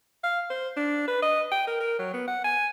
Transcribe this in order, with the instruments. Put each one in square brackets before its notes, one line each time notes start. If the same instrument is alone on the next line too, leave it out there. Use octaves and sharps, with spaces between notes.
[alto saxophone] F5
C5
D4
B4
D#5
G5
A#4
A#4
F#3
B3
F#5
G#5